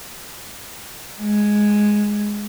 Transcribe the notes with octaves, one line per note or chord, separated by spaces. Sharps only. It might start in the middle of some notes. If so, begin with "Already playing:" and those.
G#3